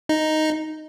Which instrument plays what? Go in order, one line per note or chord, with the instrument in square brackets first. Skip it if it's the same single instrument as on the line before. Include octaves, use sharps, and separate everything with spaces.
[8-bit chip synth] D#4